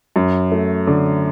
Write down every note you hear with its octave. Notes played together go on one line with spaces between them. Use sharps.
F#2
A3
D3